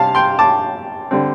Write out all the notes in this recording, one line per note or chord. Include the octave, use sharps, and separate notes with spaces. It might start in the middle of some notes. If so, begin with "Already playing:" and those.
Already playing: C3 G3 C4 F5 A5
G5 C6
A5 D6
D3 G3 C4